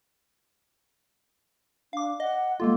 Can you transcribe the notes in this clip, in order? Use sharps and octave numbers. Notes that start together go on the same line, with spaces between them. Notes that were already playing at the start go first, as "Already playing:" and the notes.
D4 F5 D6
D#5 F#5
G#3 A#3 F4 A4